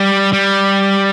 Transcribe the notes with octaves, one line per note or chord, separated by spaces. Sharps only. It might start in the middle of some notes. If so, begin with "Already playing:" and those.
Already playing: G3
G3